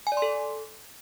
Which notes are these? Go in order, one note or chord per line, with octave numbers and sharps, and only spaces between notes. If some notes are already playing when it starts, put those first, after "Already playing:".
G#5
D5
C6
A4